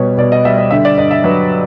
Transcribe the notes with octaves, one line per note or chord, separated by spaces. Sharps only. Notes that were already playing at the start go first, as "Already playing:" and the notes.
Already playing: B2 G3 B4 C#5
B2 D5
D#5
G3 E5
D#5
D3 E5
D5
G2 D#5
E5
F#3 B4